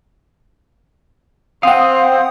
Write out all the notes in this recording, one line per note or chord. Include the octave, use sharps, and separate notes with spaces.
C4 C5 F5 F#5 D#6